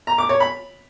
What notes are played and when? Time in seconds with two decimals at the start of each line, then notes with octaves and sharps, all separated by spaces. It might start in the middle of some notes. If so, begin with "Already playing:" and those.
0.07 A#5
0.18 D6
0.29 C#5
0.40 B5